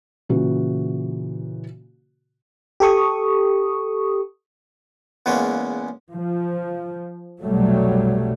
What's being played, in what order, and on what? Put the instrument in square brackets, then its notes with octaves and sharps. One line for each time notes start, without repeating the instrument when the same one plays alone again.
[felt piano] A#2 C#3 E3 F#4
[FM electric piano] G4 A4 C#6 D#6
[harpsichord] E2 C#3 G#3 A#3 B3 C#4
[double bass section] F3
F1 B1 F#3 G3 A3